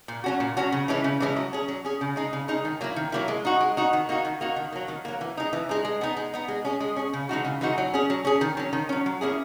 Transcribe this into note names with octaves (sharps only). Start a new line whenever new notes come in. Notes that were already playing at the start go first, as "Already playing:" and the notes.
A#2
F#3 C#4 F#4
A#2
F#3 C#4 F#4
C#3
E3 G#3 C#4 E4
C#3
E3 G#3 C#4 E4
F#3
C#4 G#4
F#3
C#4 G#4
C#3
G#3 D#4 G#4
C#3
G#3 D#4 G#4
D#3
F#3 A#3 E4
D#3
F#3 A#3 E4
G#3
D#4 F#4
G#3
D#4 F#4
D#3
A#3 D#4 F#4
D#3
A#3 D#4 F#4
D#3
F#3 A#3
D#3
F#3 A#3
E3
G#3 D#4
E3
G#3 D#4
G#3
B3 D#4
G#3
B3 D#4
G#3
C#4 G#4
G#3
C#4 G#4
C#3
E3 G#3 D#4 F#4
C#3
E3 G#3 D#4 F#4
F#3
C#4 G#4
F#3
C#4 G#4
D#3
F#3 C#4
D#3
F#3 C#4
F#3
A#3 C#4 E4 G#4